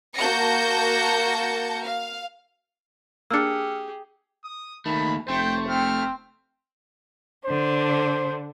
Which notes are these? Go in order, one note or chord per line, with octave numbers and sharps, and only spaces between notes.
A#3 F#4 A5 G6 A#6 C#7
F5
A#3 D4 G4 G#4 E6 F6 C#7
D#6
D#2 D#3 A3 B5
F1 A3 C5 G5
C4 F6
D3 D4 C5